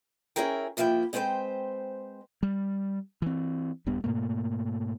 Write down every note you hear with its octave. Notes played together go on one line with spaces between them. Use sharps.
C#4 E4 G#4 A#4 G5
C3 F3 A#3 E4 G5
G#3 C4 B4 C5 G5
G3
E3 C4
D#1 G2 G3 B3
G#2 B2 A3 A#3